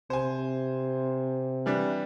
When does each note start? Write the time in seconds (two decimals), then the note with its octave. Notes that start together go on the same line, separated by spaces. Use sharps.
0.10 C3 C5 G#5
1.66 E3 G3 D4